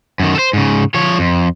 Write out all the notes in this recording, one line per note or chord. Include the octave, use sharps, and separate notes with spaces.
F#2 D#3
A4 C5
G#2 C#3
F3 C#5
F2